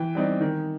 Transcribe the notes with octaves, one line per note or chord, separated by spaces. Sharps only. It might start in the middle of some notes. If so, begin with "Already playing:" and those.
Already playing: E3 G5
G3 C4 D#4
D#3